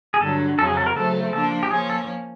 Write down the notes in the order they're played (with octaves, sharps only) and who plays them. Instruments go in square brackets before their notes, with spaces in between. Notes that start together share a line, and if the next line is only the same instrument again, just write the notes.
[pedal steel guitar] G#4
[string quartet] G2 D3 F#3 [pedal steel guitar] A4
[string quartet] F2 C#3 F#3 [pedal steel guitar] A4
[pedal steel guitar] G#4
A4
A#4
[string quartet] C#3 F#3 A3 C4 [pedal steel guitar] A4
[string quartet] F3 A#3 D4 [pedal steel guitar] A4
[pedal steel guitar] G4
[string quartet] F3 A#3 C#4 [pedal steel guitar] G#4
[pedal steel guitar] A4